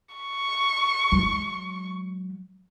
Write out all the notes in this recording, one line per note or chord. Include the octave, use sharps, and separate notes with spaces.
C#6
F#3 G#3